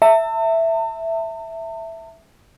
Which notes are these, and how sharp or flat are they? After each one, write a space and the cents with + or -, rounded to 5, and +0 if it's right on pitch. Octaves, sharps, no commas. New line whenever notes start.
E5 +0 A5 +45